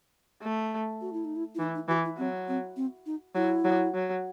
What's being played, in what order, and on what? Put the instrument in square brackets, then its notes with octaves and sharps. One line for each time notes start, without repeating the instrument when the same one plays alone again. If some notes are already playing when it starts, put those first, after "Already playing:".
[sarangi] A3
[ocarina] F#4
E4
D#4
E4
E4
[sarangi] E3 [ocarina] D#4
[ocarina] D#4
[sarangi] E3 [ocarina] F#4
[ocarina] E4
[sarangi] F#3 [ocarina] C4
[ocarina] C4
C4
D#4
[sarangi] F#3 [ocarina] E4
[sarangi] F#3
F#3